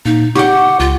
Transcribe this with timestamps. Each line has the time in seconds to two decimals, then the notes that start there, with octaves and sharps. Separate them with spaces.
0.06 A#2 D#4
0.35 G4 F#5 G5 C#6
0.80 C#2 F4